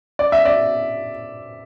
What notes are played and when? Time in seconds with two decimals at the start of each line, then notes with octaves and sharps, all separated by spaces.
0.19 D5
0.32 E5
0.45 D5